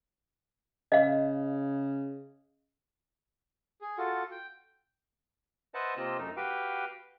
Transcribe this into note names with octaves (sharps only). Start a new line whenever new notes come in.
C#3 D#5 F5
G#4
F4 F#4 A4
G5
B4 C5 D#5 E5 F#5 A5
C3 A#3 C4 F4 D#5 E6
F#2 A3 D#4
F#4 G4 B4 F5 G5